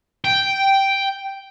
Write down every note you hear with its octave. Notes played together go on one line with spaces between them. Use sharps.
G5